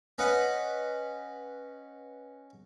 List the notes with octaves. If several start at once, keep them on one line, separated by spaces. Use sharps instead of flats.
C#4 B4 D#5 F#5